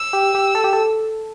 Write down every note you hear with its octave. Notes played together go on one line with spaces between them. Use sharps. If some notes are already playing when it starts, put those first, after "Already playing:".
Already playing: E6
G4
G4
A4
G4
A4